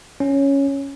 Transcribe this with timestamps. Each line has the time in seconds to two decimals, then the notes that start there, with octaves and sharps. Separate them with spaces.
0.20 C#4